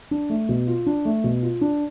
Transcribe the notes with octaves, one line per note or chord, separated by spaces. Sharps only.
D4
A3
B2
F4
D4
A3
B2
F4
D4